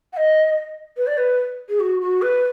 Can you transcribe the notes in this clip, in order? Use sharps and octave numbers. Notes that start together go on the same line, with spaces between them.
F#5
D#5
B4
D5
B4
G#4
F#4
F#4
B4